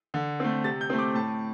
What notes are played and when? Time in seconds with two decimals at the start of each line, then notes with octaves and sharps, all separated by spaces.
0.14 D3
0.40 A3 C4
0.64 C3 A6
0.81 G6
0.90 A3 C4
0.99 D6
1.14 A2 A5